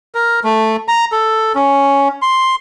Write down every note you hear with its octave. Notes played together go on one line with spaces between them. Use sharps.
A#4
A3
A#5
A4
C#4
C6